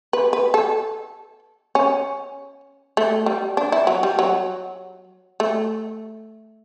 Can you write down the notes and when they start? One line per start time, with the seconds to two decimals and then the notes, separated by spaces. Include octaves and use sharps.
0.13 B4
0.33 B4
0.54 A4
1.75 C#4
2.97 A3
3.26 G3
3.57 D4
3.72 E4
3.87 F#3
4.03 G3
4.19 F#3
5.40 A3